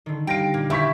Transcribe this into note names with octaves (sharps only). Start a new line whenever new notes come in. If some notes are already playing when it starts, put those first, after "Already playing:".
D3 D#3
G3 F5 G5 A#6 D7
A#2 A#3 F4
E4 G4 E5 C#6 B6